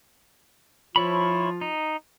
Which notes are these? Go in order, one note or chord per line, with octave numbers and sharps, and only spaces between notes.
F3 E4 F4 C#5 B5
D#4